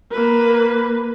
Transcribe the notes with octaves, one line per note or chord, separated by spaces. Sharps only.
A#3 B4